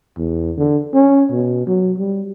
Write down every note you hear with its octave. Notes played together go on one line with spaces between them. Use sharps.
E2
D3
C#4
B2
F#3
G3